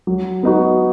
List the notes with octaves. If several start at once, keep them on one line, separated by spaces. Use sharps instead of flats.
F#3
B3 D#4 F#4